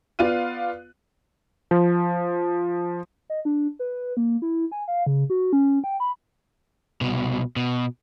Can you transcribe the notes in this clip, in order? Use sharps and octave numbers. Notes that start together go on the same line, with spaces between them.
B3 F4 D5 F5 F#6 D#7
F3
D#5
D4
B4
A#3
E4
G#5
F5
C#3
F#4
C#4
G5
B5
C2 B2
B2